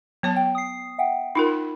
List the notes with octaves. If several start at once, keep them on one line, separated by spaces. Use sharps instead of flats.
F#3 B3 C#5 A5
G5
D#6 C7
E5 F#5 G5
D#4 F4 A#4 B5